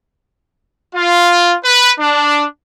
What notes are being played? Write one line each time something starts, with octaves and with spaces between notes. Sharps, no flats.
F4
B4
D4